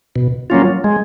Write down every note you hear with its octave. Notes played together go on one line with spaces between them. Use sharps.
B2
F#3 A#3 C#4 F4
G#3